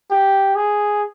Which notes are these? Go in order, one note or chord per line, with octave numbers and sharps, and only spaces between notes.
G4
G#4